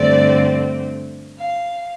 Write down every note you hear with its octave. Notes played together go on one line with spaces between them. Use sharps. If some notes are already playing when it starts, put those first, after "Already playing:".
Already playing: G2 D3 A3 C4 D5
F5